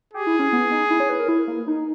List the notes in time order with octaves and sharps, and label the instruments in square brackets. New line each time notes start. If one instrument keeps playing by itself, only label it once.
[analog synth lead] G4 [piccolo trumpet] G#4
[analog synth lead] E4
C#4
B3
D#4
E4
C#5
B4
A#4
E4
A#3
D#4